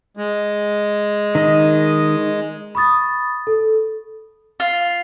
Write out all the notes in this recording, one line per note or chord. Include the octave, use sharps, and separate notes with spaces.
G#3
D#3 D#5
B5 C#6 D#6 A6
A4
F4